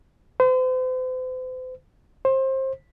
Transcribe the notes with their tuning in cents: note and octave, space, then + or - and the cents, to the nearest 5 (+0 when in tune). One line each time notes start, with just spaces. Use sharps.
C5 -40
C5 +25